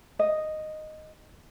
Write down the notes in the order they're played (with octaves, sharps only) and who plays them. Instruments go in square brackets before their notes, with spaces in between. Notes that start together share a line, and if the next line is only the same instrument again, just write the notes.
[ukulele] D#5